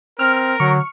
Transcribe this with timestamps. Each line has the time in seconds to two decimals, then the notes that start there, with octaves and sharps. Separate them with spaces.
0.19 C4 A#4 F6
0.60 D3 F#3 C#6